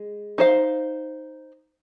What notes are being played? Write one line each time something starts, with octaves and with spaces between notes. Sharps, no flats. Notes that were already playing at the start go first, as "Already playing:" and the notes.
Already playing: G#3
D#4 C5 F5